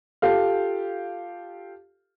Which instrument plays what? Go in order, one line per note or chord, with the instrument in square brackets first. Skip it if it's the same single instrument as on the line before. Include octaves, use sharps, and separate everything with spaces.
[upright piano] F4 G4 A4 F5